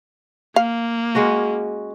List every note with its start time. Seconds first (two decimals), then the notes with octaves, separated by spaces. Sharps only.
0.56 A#3 F5
1.15 G#3 C#4 F#4